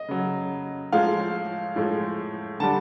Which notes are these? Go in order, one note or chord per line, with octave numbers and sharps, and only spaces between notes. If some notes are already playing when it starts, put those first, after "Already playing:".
Already playing: D#5
C#3 F#3
A2 F3 G#3 F5
A2 F3 G#3
D3 G3 A5